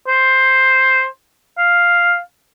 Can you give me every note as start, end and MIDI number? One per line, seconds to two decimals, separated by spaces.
0.08 1.07 72
1.58 2.18 77